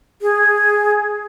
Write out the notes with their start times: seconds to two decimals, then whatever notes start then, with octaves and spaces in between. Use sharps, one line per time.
0.22 G#4